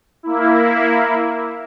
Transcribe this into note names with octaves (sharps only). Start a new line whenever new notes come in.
A#3 E4